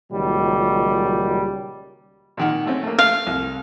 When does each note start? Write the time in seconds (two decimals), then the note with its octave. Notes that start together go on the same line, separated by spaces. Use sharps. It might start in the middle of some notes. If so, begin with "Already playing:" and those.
0.12 C#2 A#2 D#3 F#3 G3
2.37 A#2 D#3 F#5
2.66 A3 C4 C#4
2.83 A3 A#3
2.99 A3 F5
3.27 C2